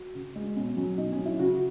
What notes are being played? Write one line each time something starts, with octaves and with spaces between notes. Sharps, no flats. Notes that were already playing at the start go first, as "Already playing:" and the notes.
Already playing: F#4
C#3
G#3
B2 C#4
F#3 C#4
B2 D#4
C#4
F#3
E4
C#3 F#4